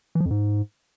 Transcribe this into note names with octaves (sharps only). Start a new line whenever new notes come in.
E3
F3
F2
G#2